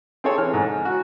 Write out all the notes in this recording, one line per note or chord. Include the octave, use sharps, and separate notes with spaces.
C4 G#4 A4 C#5
E3 F6
G#2
F#4